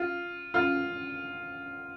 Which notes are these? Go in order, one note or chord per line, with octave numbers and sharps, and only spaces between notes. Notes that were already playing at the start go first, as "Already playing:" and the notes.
Already playing: F4
F4